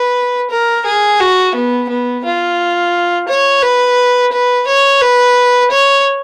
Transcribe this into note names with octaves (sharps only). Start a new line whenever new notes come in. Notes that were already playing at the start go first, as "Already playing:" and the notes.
Already playing: B4
A#4
G#4
F#4
B3
B3
F4
C#5
B4
B4
C#5
B4
C#5